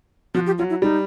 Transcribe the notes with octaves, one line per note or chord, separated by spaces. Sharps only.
F3 F#4
G4
F#3 F4
E4
G3 D#4